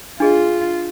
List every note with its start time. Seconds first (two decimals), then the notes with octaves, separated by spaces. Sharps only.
0.20 D4 F4 G#4 D#5